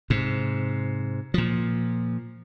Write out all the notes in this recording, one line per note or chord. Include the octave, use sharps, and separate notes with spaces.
G#2 C3
A#2 F3